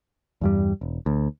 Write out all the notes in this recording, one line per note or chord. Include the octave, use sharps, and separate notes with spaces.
E2 G2 G3
E1
D2